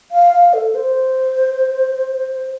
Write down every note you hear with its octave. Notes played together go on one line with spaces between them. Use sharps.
F5
F5
A4
C5